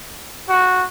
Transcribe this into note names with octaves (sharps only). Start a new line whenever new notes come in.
F#4